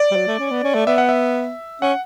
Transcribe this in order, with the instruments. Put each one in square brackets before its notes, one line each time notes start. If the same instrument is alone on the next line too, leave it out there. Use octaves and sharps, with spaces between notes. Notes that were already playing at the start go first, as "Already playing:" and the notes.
Already playing: [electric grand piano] D5
[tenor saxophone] G3
F#3
A3
C#4
B3
C#4
A3
[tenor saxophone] B3 [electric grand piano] E5
[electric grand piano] F#5
E5
[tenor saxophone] C#4 [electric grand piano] F#5